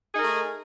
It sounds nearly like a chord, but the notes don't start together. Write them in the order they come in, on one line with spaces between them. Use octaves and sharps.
G#4 D#4 A#4 A3